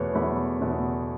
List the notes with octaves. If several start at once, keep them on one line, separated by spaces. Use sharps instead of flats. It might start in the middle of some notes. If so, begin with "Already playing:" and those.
Already playing: E2 B2 A3 B4 C#5
E2 B2 A3 B5
E2 B2 A3